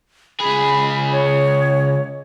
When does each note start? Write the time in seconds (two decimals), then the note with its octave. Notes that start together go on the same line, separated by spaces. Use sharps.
0.40 C#2 G#4 B5
1.12 C#5